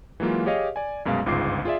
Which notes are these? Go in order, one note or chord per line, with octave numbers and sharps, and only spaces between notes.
E3 F#3 G#3 A#3 F4
G4 G#4 C#5 D#5 F5
D5 G#5
C2 F#2 B2 G#3 F5
G1 C#2 G#2 F4 D6 C7
F4 G#4 D5 E5